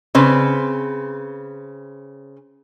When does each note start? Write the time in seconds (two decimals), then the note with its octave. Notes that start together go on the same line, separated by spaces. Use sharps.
0.15 C#3 C4 B4